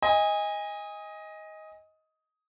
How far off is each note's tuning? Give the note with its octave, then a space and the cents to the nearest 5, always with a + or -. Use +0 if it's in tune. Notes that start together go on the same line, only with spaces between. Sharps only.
D#5 +15 G#5 -25